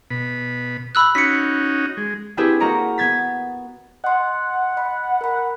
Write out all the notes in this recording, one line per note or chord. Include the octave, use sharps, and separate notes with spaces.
B2 B5
B5 E6 F#6
C#4 D#4 F#4 B6 C#7
G#3
C4 D4 E4 G4 G#4 B4
A#3 F#4 D#5 A#5 C#7 D7
B3 G#6 A6 B6
D#5 F#5 C6
D#5 B5
A#4 B5